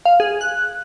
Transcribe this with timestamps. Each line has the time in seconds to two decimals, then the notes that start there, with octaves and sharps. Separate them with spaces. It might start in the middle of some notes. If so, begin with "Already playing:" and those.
0.05 F5
0.20 G#4
0.41 F#6